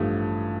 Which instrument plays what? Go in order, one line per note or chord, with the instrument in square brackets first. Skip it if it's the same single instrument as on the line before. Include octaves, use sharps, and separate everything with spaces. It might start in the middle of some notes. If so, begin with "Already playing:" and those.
Already playing: [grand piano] A1 G2 F3 A3